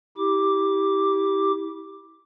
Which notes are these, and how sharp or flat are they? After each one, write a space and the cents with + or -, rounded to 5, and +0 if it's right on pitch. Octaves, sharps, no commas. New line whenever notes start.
E4 -25 G4 +0 D6 +0